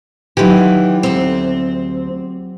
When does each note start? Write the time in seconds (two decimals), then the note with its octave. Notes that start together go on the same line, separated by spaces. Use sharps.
0.37 D#3 E3 F#3 F4 G4
1.03 D2 C4